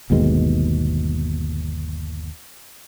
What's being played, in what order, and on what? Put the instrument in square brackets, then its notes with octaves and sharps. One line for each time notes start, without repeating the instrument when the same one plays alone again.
[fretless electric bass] G1 D#2 B2 G#3